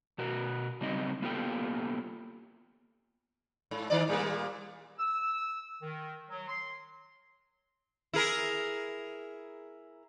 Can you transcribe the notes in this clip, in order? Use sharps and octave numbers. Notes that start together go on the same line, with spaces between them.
B2 F#4 A#4
C#3 F#3 G3 C4 D#4 D#5
A#3 B3 F4 G4 A4 G5
G#2
D#3 D#4 D5
A#2 G3 A#3
E6
D#3
F#3
C6
E4 G#4 A#4